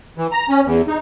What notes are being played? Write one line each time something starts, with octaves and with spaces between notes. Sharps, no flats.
E3
A#5
C#4
E2
D#4